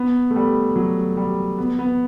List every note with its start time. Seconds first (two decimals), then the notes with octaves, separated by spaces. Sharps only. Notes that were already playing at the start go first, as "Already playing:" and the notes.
Already playing: B3
0.31 A3
0.36 G3
0.76 F#3
1.17 G3
1.58 B3
1.79 B3